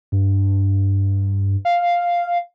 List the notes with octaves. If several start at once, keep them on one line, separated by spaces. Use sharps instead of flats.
G2
F5